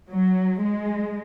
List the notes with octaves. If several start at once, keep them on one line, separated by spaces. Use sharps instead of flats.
F#3
G#3